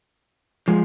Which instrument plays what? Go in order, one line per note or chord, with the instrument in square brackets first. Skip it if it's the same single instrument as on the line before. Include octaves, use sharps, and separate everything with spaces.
[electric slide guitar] F3 G#3